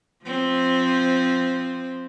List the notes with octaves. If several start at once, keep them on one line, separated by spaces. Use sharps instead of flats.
F3 C4